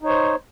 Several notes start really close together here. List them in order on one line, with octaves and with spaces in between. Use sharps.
D#4 C#5 C5